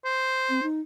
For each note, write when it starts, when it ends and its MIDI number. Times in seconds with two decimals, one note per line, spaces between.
0.05 0.64 72
0.49 0.60 60
0.63 0.81 63